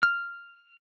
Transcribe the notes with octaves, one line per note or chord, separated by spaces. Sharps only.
F6